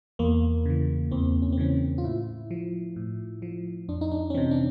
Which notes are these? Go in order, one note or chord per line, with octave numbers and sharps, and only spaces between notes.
E2 A#3
C#3 E3
E2 C4
C#4
C4
C#3 E3 C#4
F4
A2 E4
F3
A2
F3
F2 D4
D#4
D4
C#4
C3 E3 C4
D4